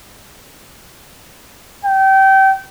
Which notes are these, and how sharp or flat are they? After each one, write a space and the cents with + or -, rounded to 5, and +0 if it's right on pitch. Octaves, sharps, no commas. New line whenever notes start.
G5 -25